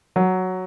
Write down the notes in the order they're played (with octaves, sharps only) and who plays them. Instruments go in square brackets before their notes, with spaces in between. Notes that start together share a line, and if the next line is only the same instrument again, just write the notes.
[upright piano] F#3